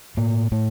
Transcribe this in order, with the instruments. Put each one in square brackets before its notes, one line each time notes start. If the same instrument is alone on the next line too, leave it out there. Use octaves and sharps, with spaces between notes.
[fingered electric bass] A2 A#3
A2 A3